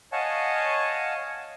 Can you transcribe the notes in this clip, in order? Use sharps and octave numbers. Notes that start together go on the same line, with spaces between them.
C#5 D#5 F5 F#5 G#5 A5